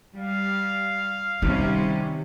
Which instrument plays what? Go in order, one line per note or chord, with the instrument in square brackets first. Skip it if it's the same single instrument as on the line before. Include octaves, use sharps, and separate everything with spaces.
[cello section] G3 [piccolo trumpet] F5
[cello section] C3 G3 C#4 [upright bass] D#3